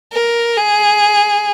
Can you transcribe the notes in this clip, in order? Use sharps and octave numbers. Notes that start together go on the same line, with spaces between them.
A#4
G#4